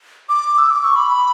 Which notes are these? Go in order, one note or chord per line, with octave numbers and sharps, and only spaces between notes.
D6
E6
D6
C#6
B5